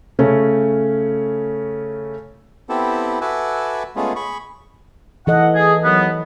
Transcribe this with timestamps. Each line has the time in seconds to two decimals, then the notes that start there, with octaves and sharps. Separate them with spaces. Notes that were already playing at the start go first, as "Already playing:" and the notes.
0.19 C#3 A3 C#4
2.69 B3 C4 E4 G4 A4
3.21 F#4 A4 B4 E5 G#5 D6
3.96 G#3 A3 B3 C#4 F4 G#4
4.16 G#4 B5 C#6
5.27 E3 A4 D#5 F#5
5.55 G#4
5.84 D#2 F#3 B3